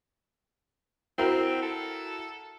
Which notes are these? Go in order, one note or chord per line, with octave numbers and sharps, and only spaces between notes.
C4 E4 F#4 A#4
A4